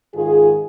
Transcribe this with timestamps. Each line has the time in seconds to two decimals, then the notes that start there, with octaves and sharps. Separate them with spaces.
0.14 G#2 D#3 F4 G#4